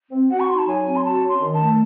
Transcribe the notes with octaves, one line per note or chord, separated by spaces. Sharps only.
C4
F#4 F#5
C#6
D#4 C6
A5
F#3 G#5
C4
C6
F#4 A5
C#4
C6
D#3
A5
A3